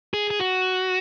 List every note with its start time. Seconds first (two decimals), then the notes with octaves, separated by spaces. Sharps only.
0.14 G#4
0.31 G#4
0.40 F#4